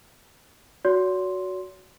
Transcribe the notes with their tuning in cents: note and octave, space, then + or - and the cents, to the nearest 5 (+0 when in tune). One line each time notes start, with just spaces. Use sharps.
F#4 +0 C#5 +45 C6 +0